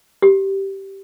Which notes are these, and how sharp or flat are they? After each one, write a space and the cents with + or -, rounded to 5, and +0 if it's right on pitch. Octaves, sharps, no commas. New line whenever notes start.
G4 -10